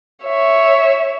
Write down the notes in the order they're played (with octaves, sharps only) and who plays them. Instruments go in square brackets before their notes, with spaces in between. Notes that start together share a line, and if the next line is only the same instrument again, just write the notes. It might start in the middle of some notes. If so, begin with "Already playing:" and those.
[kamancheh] C#5 E5